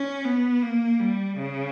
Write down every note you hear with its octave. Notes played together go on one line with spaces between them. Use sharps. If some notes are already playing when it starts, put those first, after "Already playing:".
Already playing: C#4
B3
A#3
G3
C#3